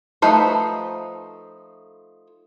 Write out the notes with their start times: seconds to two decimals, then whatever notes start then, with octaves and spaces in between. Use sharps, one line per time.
0.22 F3 A3 D#4 B4 C5